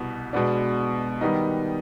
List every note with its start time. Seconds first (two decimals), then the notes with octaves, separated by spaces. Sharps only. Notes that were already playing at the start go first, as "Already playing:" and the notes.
Already playing: C2 B2 B3
0.33 B2 G#3 B3 D4
1.21 D#3 G3 B3 D#4